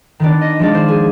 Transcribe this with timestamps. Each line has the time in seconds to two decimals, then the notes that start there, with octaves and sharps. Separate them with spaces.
0.20 D#3 B3 D4 D5
0.41 D#5
0.59 F3 G#3 D4 D5
0.74 C5
0.88 G#4